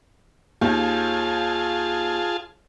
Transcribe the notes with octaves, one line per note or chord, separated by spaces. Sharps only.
D#2 F4 G#4 A5